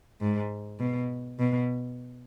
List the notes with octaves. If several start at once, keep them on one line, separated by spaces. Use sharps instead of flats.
G#2
B2
B2